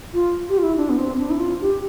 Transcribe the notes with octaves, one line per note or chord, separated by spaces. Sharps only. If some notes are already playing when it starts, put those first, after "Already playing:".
F4
G4
F4
E4
D4
B3
C4
D4
E4
F4
G4